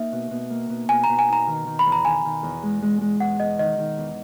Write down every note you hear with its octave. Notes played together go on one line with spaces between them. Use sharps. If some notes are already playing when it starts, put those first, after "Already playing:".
Already playing: A#3 D#4 E5
B2
B2
A#3
B2
B2 G#5
A#5
B2
G#5
D#4 A#5
D#3
D#3
B5
E2
A#5
D#3 G#5
D#3
E2
G#3
G#3
G#3
E2 F#5
E2 D#5
D#3 D#5
D#3
E2